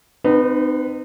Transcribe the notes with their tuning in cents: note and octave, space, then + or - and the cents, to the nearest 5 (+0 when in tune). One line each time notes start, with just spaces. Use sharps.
C4 -40 D#4 -30 B4 +0